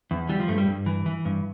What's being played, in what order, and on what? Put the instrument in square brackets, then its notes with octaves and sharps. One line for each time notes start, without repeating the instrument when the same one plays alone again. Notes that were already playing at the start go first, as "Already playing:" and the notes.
[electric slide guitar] E2
E3 G3
F3
G2 A3
G3
G2
E3
E3
G2